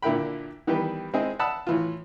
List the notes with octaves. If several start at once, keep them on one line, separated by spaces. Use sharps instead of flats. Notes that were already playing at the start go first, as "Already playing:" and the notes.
A#2 D3 E4 A#4 G5 B5
D#3 E3 G3 B3 G4 B4
G#3 C4 D#4 E4 G#4
F#5 A5 B5 D#6 E6
A2 E3 F4